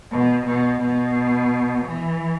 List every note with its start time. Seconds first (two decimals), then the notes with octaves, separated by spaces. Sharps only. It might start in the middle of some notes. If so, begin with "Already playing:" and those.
0.11 B2
0.46 B2
0.81 B2
1.85 E3